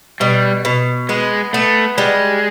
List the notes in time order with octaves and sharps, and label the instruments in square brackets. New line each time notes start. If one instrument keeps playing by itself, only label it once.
[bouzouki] B2 [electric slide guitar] G3
[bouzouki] B2
[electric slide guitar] G#3 [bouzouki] B3
[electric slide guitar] A3 [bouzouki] B3
[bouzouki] G3 [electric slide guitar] G#3